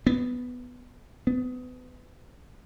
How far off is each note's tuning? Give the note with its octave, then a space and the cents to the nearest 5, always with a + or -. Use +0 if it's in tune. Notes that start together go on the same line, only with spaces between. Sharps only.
B3 +5
B3 +30